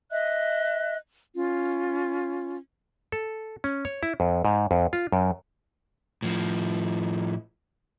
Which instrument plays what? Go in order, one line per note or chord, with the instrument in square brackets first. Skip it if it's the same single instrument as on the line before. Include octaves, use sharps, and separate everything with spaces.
[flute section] D#5 E5 F#6
C#4 F4
[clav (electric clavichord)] A4
C#4
C#5
E4
F2
G#2
F2
F4
F#2
[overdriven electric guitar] A2 F3